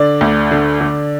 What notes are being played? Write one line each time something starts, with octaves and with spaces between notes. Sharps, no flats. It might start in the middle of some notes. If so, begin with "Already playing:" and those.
Already playing: D3 D5
D2
D3
D3